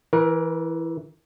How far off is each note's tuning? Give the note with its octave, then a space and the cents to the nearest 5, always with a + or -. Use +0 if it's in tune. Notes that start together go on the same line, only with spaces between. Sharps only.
E3 +0 A#4 +30